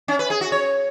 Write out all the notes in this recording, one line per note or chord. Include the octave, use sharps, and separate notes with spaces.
C#4
B4
G#4
F#4
C#5